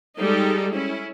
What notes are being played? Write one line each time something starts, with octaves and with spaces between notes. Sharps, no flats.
G3 G#3 D#4 G4 A4
C#4 E4